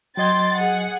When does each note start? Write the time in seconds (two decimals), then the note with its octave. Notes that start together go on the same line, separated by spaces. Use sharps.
0.17 F#3 D#5 G5 C6 G#6 A6
0.57 G#4 F#5